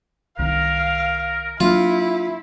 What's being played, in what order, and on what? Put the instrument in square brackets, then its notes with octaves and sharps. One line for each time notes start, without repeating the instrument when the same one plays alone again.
[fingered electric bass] C2 D#3 [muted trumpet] A#4 [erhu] F5
[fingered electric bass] F#3 A#3 D4 [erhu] E4 [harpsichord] F4